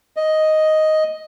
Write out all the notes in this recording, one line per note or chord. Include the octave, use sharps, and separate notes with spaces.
D#5